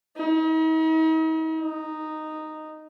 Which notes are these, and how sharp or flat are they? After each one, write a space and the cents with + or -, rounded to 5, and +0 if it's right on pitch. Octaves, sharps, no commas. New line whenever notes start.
D#4 +45
D#4 -5